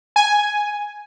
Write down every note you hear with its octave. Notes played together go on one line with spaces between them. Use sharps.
G#5